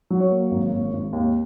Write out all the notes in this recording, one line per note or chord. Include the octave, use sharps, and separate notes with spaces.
F#3
C#5
A#3
G#1
G#1
G#1
D#2